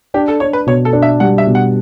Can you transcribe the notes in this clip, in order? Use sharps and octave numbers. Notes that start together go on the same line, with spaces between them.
D4 G4
A4
D4 C#5
B4
B2 C#5
A4
D4
E5
G3 F#5
E5
B2
F#5